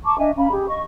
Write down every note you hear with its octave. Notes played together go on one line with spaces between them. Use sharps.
A5 A#5 C#6 D6
D4 D#5 E5 G#5
C#4 F5 A#5 B5
G4 G#4
D#5 C#6